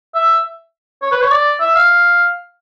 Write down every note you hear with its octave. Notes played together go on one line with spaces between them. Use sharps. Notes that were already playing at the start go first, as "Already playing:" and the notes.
E5
C#5
B4
C#5
D5
E5
F5